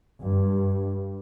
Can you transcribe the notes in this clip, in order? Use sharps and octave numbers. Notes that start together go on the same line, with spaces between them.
G2